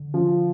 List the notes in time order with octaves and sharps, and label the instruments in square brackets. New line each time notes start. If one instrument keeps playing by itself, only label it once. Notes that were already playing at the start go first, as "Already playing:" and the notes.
Already playing: [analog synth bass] D3
[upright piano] F3